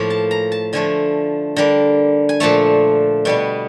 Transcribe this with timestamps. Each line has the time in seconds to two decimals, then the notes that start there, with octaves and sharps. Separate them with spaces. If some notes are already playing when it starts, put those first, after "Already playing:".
Already playing: A2 F3 A#3
0.10 A5
0.31 A#5
0.52 A5
0.73 D3 F3 A3 G#5
1.56 D3 G3 A#3
2.29 G#5
2.40 A#2 F3 A3 A5
3.25 B2 G3 B3